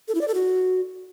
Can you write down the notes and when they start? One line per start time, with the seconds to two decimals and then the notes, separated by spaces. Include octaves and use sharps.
0.08 A4
0.15 E4
0.21 D5
0.28 A4
0.34 F#4